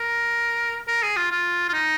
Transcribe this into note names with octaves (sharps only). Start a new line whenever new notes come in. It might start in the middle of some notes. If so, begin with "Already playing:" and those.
Already playing: A#4
A#4
G#4
F4
F4
F4
D#4